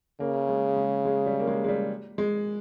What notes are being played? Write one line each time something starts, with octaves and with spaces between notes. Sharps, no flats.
C#3 A#3
G#3
G#3
G#3
G3
A#3
G#3
G#3
G3
G#3